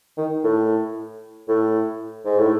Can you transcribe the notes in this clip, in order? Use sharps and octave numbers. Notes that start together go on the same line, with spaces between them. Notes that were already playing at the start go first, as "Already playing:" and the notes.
D#3
A2
A2
G#2
A2